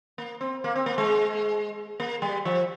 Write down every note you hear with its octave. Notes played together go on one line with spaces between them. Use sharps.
A#3
C4
A#3
C4
A#3
G#3
A#3
G3
F3